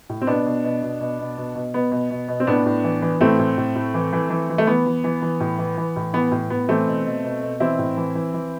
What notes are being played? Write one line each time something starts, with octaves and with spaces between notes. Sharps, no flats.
A2
C4
B2 B3 D4
B2
B2
B2
B2
B2
B2
B2
B2 B3
B2
B2
B2
C4
A2 B3 D4
A2
E3
E3
A2 A3 C4
A2
A2
A2
E3
E3
E3
E3
A3
E3 B3
E3
E3
E3
A2
E3
E3
A2
E3 B3
A2
A2 B3
E3 A3 C4
B2
B2
B2
B2
E3 C4 E4
A2
E3
E3
E3